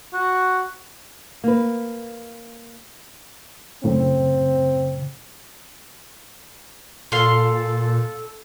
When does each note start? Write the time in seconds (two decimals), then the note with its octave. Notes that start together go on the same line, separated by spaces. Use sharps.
0.13 F#4
1.44 A#3 B4
3.84 F#2 A2 C#3 C4
7.12 A#2 A4 F5 C6